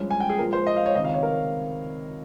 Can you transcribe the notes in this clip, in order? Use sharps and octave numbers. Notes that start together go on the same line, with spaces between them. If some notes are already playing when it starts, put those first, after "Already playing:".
Already playing: G2 F3 G#3 C#4
G#5
G5
G#4
A#2 F3 G#3 A#4
C5
D#5
F5
C#5
C#2 C3 D#3 D#5
F5
C#5
A#4